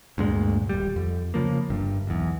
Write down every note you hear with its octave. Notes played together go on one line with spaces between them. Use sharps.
D2 G2 A#2 G#3
D#1 G3
F2
C#3 F3 A#3
G1 G2
B1 E2